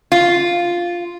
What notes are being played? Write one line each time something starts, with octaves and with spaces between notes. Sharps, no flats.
F4